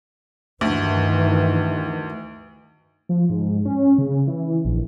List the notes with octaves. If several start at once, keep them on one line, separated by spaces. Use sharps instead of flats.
D2 G2 D#3 E3
F3
G#2
C#4
C#3
E3
A#1